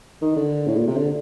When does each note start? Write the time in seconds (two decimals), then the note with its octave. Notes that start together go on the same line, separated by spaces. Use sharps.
0.22 D#3
0.36 D3
0.67 A2
0.76 A#2
0.87 C3
0.96 D3